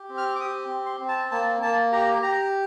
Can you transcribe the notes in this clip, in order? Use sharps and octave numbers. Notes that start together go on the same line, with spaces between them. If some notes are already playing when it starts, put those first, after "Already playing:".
Already playing: G4
C4
F6
D6
G4 D#6
C4
C6
C4
A5
A#3 A5
A#3 A5
G4 A#5
G4 A#5